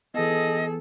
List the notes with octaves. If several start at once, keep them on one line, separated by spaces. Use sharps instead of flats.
E3 B3 G#4 A4 D#5